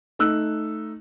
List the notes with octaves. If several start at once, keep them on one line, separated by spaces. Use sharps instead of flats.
A3 D#4 E6 F#6